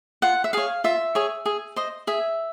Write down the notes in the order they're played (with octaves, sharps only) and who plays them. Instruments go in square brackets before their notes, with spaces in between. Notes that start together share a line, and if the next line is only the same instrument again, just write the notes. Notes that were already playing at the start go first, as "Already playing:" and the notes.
[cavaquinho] F4 F#5
E5
G#4 C#5 F5
F4 E5
G#4 C#5
G#4
C5 D#5
G#4 E5